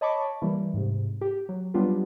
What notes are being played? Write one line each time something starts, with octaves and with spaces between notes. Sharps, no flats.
C#5 D#5 A5 B5 C#6 D6
E3 G3 A#3 E4
G#2 C3
G4
F#3
F#3 G3 B3 D4 F4 G4